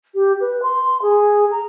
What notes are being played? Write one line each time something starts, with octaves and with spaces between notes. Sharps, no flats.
G4
B4
C6
G#4
A#5